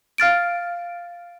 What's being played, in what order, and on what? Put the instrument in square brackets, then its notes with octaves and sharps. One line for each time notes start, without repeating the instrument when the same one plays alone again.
[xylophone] F5 F6 A6 D7